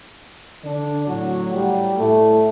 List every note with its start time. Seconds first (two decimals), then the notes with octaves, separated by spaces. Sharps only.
0.63 D3 D4
1.08 A2 F#3 F#4
1.53 G3 G4
1.97 A2 A3